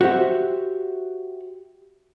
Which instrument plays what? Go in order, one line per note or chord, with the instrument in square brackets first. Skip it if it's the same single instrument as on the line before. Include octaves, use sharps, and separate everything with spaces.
[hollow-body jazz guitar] F#4 G4 C5 E5